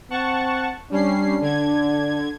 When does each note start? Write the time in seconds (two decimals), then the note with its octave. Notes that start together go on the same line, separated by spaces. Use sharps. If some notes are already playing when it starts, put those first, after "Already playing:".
0.11 C4 F#5 A5 C#6
0.91 G3 C#4 D4 C7
1.41 D3 G#6